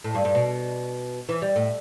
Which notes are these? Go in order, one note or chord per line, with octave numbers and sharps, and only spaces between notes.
A2
G2
G2
B2
E3
G3
A2